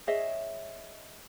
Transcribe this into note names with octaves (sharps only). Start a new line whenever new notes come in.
G#4 C#5 D#5 E5